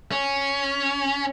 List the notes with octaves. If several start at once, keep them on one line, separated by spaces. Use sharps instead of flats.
C#4